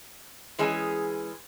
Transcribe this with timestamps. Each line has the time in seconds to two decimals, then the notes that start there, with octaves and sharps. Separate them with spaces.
0.59 E3 G#3 C#4 G#4